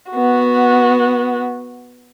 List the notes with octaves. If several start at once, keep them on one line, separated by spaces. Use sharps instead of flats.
B3 F#4